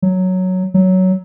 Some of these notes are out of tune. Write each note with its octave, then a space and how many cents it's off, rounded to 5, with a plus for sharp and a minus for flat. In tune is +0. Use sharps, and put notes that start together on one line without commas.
F#3 +0
F#3 +10